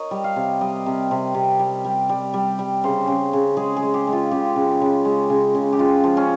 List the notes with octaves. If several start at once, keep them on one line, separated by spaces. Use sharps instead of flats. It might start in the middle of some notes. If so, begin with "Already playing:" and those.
Already playing: A#4 C#5 D#5
G3
F5
C3
G3 D#5
C3
C3
C3
G3
G3
G3
G3
G3
C#3 C5
C#3
C#3
G#3 G#4
G#4
G#3
G4
G#3
F4
C#3 G4
C#3
C#3
G#3
C#3
C#3
G4
G#3 F4
F3
C#4